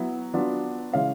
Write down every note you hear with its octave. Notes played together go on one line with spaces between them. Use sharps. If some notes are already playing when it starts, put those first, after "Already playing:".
Already playing: F#3 B3 E4
F#3 B3 D4 F4
C#3 E3 G#3 C#4 E4 F5